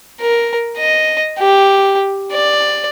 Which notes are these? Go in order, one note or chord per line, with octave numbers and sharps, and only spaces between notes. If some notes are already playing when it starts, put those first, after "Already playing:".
A#4
D#5
G4
D5